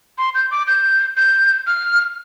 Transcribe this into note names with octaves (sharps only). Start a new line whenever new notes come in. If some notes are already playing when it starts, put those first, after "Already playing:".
C6
G6
D6
G6
G6
F6